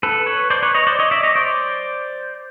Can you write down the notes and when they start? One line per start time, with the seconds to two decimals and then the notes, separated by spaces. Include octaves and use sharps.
0.03 A4 B4
0.26 B4 C#5
0.50 C5 D5
0.63 B4 C#5
0.74 C#5 D#5
0.87 C5 D5
0.99 C#5 D#5
1.11 D5 E5
1.23 C#5 D#5
1.35 C5 D5